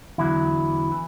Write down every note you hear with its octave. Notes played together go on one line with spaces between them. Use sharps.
E2 D3 F#3 E4
E3